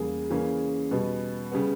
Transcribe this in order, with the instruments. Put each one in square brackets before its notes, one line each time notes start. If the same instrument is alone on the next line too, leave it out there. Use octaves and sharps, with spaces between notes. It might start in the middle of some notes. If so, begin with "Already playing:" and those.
Already playing: [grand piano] E2 C#3 G3 A#3 G#4
C#3 E3 A#3 C#4
B2 G3 B3
C#3 G3 B3